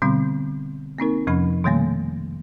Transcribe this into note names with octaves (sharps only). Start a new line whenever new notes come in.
B2 D3 G3 B3 C4
A#3 C4 D#4 A#4
F2 C3 F3 C#4 B5
B2 D#3 G3 A3 A#3